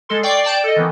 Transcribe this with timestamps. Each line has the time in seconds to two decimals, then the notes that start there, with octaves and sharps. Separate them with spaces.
0.09 G#3 A4 C6
0.23 D5 G5 C#6 D6 C7
0.44 D5 G5 A5 G6 D7
0.64 A4 D#5
0.76 D#3 E3 B3